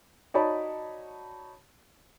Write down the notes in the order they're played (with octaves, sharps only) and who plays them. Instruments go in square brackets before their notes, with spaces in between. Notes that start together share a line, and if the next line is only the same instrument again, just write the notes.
[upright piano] D#4 F#4 C#5 D5 A5 B5